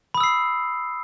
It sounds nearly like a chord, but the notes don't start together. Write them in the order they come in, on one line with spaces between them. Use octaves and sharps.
B5 D#6 E6 C7